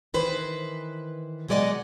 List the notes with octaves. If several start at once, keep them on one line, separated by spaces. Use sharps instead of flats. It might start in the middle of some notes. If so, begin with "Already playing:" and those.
D#3 E3 B4 C5
B2 F#3 G#3 D5 D#5 F#5